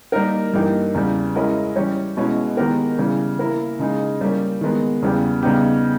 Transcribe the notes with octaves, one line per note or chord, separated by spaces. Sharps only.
G3 A#3 D#4 A#4
G2 E3 A#3 D#4 G4
E2 C#3 G3
G#3 C#4 E4 A#4 D#5
E3 G3 C#4 G4 C#5
B2 G#3 C#4 E4
D#3 G#3 B3 G4 A#4
C#3 E3 G3
A#3 E4 A#4
C#3 G#3 D#4 G#4
G3 A#3 C#4
D#3 G#3 B3
E2 C#3 G3 B3 G4
C#3 G3 B3 D#4 G4